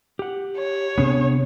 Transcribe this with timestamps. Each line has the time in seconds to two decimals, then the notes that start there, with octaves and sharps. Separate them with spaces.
0.19 G4 F#5
0.59 C#5
0.98 C3 B3 C#4 D4 G#4